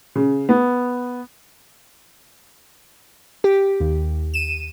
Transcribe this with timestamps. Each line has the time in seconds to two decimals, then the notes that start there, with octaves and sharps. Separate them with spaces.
0.15 C#3
0.49 B3
3.44 G4
3.80 D#2
4.34 D#7 E7